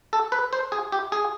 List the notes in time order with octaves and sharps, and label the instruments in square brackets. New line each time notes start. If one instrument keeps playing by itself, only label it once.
[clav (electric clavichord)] A4
B4
C5
G#4
G4
G#4